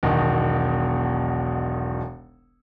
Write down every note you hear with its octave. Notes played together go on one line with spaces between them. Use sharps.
E1 B1 B2 D#3